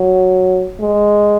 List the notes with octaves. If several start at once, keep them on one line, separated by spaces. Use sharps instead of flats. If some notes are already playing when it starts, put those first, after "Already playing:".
Already playing: F#3
G#3